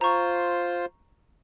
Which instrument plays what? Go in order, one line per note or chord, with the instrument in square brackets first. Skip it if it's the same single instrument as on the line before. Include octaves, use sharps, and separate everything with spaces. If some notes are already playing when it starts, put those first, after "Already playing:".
[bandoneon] F4 C5 [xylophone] A#5 C#6